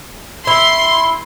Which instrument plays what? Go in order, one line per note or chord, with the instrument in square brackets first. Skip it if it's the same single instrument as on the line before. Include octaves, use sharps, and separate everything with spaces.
[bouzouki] E4 [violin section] C6